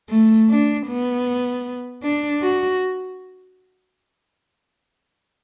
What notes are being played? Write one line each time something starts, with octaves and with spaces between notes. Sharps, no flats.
A3
D4
B3
D4
F#4